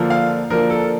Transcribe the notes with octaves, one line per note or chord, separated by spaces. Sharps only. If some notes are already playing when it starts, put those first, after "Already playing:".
Already playing: D3 F3 A#3 D4 F4
F5
D3 F3 A#3 D4 F4 A#4
A4